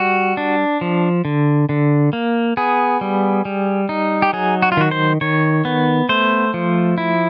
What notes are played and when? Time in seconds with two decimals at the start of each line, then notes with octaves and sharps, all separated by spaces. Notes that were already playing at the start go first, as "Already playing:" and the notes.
Already playing: G3 F#4
0.37 D4
0.81 F3
1.25 D3
1.69 D3
2.13 A#3
2.57 B3 G#4
3.01 G3
3.45 G3
3.89 D#4
4.22 G4
4.33 F#3 G#4
4.62 F#4
4.72 F4
4.77 D#3 F#4
4.91 C5
5.21 D#3 C#5
5.65 B3
6.09 A3 C5
6.54 F3
6.98 E4